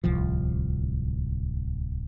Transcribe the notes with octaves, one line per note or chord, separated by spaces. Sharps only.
D1 C2 F3